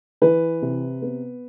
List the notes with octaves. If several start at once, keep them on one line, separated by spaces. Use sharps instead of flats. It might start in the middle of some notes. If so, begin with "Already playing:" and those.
E3 B4
C3
B3